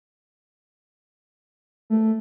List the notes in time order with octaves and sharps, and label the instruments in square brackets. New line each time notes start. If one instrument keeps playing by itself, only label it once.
[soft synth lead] A3